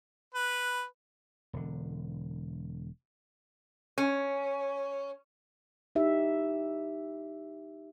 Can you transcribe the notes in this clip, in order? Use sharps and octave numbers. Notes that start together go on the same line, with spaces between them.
B4
E1 D3
C#4
D#4 G4 E5